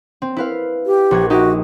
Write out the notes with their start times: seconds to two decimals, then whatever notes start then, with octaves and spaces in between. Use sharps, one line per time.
0.22 C4
0.37 E4 B4 F5
0.86 G4
1.11 A#1 F#4 G#6
1.30 D#4 F#4 G4 E5